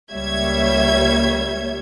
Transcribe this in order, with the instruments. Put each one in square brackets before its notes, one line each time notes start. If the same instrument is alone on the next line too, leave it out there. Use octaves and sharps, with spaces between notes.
[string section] C#2 G3 A#3 C#5 E5 G#6